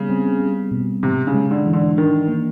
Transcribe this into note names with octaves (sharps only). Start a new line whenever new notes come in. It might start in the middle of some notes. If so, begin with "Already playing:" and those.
Already playing: C#3 G3 B3
C4
G3
B2
G#2 C3
C#3
G#3
D3
E3
D3
D#3 D4
A#3